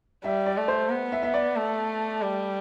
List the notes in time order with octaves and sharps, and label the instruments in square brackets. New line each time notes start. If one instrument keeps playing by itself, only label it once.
[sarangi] G3 [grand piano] E5
[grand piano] D5
[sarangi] A3
[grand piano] C5
[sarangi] B3
[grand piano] E5
E5
D5
[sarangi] A3
G3